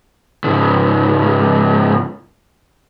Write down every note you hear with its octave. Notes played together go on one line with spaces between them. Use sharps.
C#2 G#2